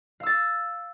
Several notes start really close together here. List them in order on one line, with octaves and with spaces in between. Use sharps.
F5 E6 A6